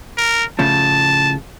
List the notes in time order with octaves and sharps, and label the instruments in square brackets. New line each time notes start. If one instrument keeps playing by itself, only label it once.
[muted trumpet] A#4
[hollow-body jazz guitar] A2 C#3 F3 [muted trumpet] A5